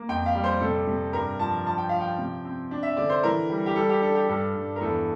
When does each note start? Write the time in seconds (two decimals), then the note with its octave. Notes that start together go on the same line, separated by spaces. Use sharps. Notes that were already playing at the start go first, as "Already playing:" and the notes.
Already playing: A#3
0.09 F2 G5
0.26 F5
0.34 G3
0.44 C5
0.61 C3 A4
0.87 C3
1.13 G2 A#4
1.39 F3 A5
1.66 F3 A5
1.78 G5
1.89 F3 F5
2.01 G5
2.19 C3
2.45 C4
2.71 D4
2.83 E5
2.97 D3 D5
3.10 C5
3.23 E3 A#4
3.50 G3
3.66 G4
3.75 G3 A4
3.89 G4
4.02 D4 A4
4.15 G4
4.28 G2 A4
4.55 G2
4.76 A#4
4.81 E2 A4